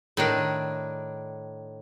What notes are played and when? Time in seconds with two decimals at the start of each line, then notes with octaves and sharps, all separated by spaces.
0.17 A2 D#3 D4